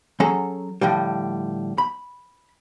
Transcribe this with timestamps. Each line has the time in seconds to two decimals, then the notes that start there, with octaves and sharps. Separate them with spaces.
0.20 F#3 C#4 G#4 A4 A#5
0.81 A2 D3 F3 G3
1.78 B5